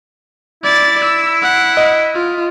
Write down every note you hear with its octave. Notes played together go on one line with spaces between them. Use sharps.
E4 D5 A6
E6
F#5
D#5
F4